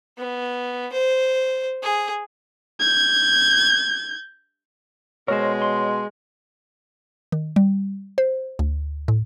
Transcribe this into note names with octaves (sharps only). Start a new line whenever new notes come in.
B3
C5
G#4
G6 G#6
B2 G#3 A#4 C5 C#5
C6
D#3
G3
C5
D2
A2